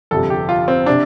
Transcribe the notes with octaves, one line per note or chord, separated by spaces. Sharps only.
G1 F2 C3 G3 A4
G4
F4
C4
C3 D4